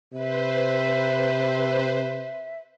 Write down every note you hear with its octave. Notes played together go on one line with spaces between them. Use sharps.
C3 B4 C5 E5